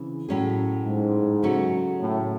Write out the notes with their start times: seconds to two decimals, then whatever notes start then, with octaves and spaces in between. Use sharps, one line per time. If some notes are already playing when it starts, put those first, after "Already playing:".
Already playing: C#3 E3 C4
0.28 A2 F#3 C#4 G#4
0.85 G#2
1.43 C#3 F#3 A3 C#4 F#4
2.00 A2